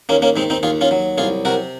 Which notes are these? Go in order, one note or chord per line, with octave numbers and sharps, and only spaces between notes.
D#2 A#3 C#4
A#3 C#4
D#3 G#3 C4
C4 D#4
D#2 F4 G#4
C#4 F4
F#3
C2 F4 G#4
C3 F#4 A#4